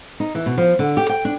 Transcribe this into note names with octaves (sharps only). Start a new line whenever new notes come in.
D#4
E3
B2
F3
D3
G4
G5
D4